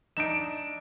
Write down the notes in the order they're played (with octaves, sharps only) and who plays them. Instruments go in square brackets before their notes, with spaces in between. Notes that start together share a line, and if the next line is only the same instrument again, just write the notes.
[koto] D4 D#4 E5 [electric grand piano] D7 E7